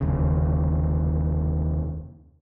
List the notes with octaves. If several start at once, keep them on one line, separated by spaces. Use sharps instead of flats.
F1 D#2 C#3